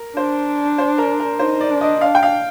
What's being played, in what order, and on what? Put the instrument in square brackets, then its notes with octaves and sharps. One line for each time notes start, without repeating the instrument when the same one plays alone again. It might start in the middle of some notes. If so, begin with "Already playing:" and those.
Already playing: [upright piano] A#4
[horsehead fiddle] D4 [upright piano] C5
[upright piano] C5
A#4
A#4
[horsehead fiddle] D#4 [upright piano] C5
[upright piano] D5
[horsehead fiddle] D4
[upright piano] D#5
[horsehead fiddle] D4 [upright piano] F5
[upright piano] G5
F5